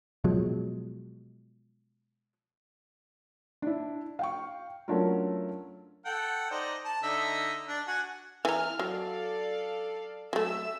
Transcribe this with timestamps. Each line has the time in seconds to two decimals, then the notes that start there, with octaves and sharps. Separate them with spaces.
0.24 B2 F3 F#3 G#3
3.62 D4 E4
4.19 F5 G5 C#6
4.88 F#3 A3 C#4 D4 F4 A#4
6.06 A4 F#5 G5
6.51 D#4 C5 D5
6.85 A5
7.03 D3 D#4 E5
7.67 D4
7.87 F#4 G#5
8.45 E3 A#5 F6
8.79 F#3 A4 D5 F5
10.33 F#3 A3 E5 E6